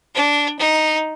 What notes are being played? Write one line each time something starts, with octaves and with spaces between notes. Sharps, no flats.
D4
D#4